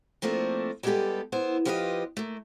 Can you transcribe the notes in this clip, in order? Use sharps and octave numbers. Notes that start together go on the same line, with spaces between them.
F3 A3 A#3 C4 D4
G3 G#3 B3 F#4 G4 A4
B3 E4 C5
F3 F4 G4 B4 C5 D#5
A3 A#3